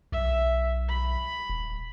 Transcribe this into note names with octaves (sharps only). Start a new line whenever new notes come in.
B1 E5
B5
D#1